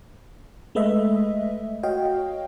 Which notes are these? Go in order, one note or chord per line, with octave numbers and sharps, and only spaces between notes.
G#3 A3 B4 D#5 E5
F#4 C#5 D#5 F5 G5